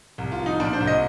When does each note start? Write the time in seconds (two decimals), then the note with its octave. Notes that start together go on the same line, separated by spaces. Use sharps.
0.18 C2
0.32 F4
0.39 F3
0.46 D#4
0.60 A#2 D4
0.73 C5
0.80 C2
0.87 D#5